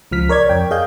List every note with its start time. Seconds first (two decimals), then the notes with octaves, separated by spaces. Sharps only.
0.11 C#2 F3 F6 B6
0.29 A#4 C#5 D5 G#6
0.49 F2 G5
0.71 G#4 D#5 F5 G6